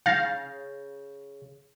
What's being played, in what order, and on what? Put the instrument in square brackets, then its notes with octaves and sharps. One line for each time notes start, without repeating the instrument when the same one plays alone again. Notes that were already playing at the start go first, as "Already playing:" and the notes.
[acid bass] C#3 [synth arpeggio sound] F5 [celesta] G6 A6 A#6